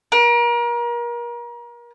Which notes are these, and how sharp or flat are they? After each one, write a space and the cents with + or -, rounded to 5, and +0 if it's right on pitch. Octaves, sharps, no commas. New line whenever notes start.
A#4 +35